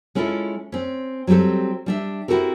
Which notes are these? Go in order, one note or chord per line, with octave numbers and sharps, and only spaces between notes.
G#3 C#4 E4 F4 A4
C4 C#4
F#3 G3 C4 G4 A4
G3 D4 E5
C4 E4 F#4 G4 A4 A#4